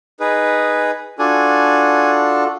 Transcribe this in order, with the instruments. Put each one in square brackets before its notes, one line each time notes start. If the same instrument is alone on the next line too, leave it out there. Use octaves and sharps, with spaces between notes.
[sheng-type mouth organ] D#4 G#4 B4
[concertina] D4 [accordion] F4 F#4 A4 [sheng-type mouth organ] G#5